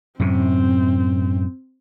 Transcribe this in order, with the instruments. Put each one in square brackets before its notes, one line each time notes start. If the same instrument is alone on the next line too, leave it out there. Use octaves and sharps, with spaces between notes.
[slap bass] F#2 A2 C3 [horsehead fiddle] C4